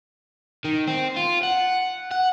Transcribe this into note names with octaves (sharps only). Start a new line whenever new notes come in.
D#3
C4
F4
F#5
F#5